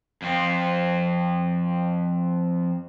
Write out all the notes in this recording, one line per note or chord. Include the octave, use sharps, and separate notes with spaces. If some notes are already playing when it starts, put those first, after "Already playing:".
F2 C4